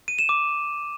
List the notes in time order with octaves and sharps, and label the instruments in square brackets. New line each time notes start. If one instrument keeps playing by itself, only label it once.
[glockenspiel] D#7
E7
D6